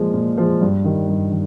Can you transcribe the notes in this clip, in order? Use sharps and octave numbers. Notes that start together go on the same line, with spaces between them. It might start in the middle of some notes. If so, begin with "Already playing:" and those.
Already playing: A#2 F3 G#3
A#2
F3 G#3
G2
D#3 G3
G2
D#3